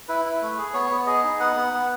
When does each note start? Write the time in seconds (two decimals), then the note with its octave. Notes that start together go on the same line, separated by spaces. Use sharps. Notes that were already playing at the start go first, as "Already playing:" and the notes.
0.08 E4 B4
0.25 E4
0.42 A3
0.58 G#4
0.74 B3 C#5
0.91 B3
1.07 G#4 D#5
1.24 D#4
1.40 B3 F#5
1.56 B3
1.73 B3